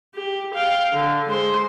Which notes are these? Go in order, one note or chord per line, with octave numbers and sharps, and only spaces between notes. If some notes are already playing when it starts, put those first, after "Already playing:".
G4
F5 G5
D3
G#3 C5